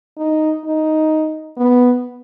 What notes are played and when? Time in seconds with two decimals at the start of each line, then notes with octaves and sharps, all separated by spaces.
0.17 D#4
0.64 D#4
1.57 B3